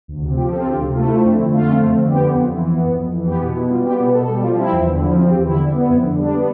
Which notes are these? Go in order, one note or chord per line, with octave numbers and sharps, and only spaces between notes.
D2
C3
F3 G4
C4 A4
F4
D2 G4
C3
A3 F4
E4
C4 F4
F2 D4
D3 E4
A3 F4
C4
F2
D3
B3 G4
F2
F2 F4
E3 E4
B3
F2
F2
E3
B3 G4
B2
B2 E4
G3 F4
B3 G4
B2
B2 A4
A4
G3 G4
F3 F4
C4 E4
E2
D3
F3 E4
C4 F4
E2 G4
D3 E4
G3
B3
F2 E4
D3
G3 D4
B3